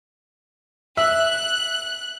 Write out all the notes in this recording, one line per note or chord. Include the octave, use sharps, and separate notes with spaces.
E5 F#6